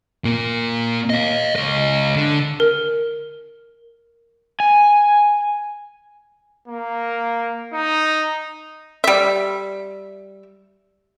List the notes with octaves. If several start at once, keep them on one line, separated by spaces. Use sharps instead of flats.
A#2 A#3
D#5 F5
C#2 D#5
D3
A#4
G#5
A#3
D#4
G3 E5